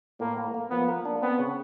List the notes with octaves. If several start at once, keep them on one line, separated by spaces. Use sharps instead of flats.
A2 A#3
A#3
A#3
F3 B3
A#3
D4
B3 C4
C#3